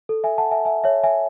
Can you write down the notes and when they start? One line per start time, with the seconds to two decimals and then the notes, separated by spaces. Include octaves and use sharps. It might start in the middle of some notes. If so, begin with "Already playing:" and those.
0.09 A4
0.24 E5 G#5
0.38 F#5 A5
0.51 E5 G#5
0.65 E5 G#5
0.84 C#5 E5
1.04 E5 G#5